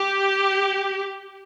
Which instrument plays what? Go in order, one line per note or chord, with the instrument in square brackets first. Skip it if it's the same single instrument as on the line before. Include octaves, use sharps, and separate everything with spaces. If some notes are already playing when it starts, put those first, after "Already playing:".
Already playing: [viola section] G4